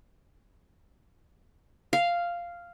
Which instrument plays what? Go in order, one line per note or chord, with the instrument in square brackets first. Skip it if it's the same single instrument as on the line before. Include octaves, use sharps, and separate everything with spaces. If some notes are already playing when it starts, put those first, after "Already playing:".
[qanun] F5